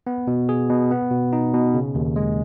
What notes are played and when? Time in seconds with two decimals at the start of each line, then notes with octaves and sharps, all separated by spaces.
0.07 B3
0.27 B2
0.49 G#4
0.69 B2
0.91 B3
1.11 B2
1.33 D#4
1.53 B2
1.74 C#3
1.95 D#2
2.16 G#3